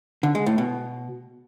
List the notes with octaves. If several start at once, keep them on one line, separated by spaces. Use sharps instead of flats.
D3
G#3
A2
B2